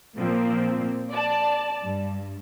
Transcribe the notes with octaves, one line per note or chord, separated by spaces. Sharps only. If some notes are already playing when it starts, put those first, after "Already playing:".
A#2 F3 A#3 C4
D5 A5
G2